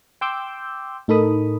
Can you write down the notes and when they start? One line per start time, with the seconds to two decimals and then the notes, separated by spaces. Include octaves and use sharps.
0.21 G5 C6 D6 E6 G6
1.08 A2 D#4 A4 A#4 B5 D#6